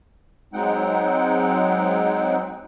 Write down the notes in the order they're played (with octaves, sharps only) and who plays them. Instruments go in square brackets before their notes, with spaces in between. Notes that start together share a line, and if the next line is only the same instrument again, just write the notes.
[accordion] F#3 G#3 C4 D#4 F#5 G5